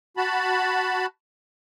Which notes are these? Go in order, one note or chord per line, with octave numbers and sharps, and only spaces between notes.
F#4 A5 B5